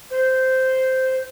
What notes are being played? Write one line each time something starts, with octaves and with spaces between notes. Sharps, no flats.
C5